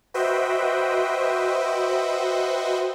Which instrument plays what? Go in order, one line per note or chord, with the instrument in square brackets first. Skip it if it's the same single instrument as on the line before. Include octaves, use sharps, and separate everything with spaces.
[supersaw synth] F#4 B4 C5 D#5 E5 G5